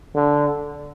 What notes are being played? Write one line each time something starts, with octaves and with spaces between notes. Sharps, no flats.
D3